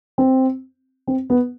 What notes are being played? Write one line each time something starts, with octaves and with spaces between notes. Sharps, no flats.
C4
C4
B3